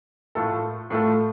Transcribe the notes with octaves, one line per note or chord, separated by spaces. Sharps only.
A2 A3 F4 A4
A2 A3 F4 A4